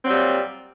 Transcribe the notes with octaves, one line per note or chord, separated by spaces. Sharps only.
A#2 F#3 G3 C4